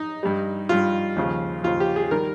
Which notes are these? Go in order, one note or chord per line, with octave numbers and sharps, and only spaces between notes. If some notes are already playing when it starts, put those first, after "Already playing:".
Already playing: D#4
G2 G3
G2 G3 F4
D#2 C#3 F3
D#2 C#3 F3 F4
G4
G#4
D#3 G3 A#4